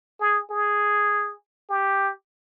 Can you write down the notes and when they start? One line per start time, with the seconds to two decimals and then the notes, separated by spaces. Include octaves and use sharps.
0.20 G#4
0.50 G#4
1.69 G4